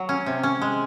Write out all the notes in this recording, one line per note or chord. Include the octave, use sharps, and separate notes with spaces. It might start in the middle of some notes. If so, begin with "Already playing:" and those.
Already playing: F#3
C#4
C3
C#4
G#3